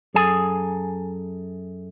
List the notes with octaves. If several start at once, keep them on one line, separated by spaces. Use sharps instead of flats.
F#2 G#4 A4 G#5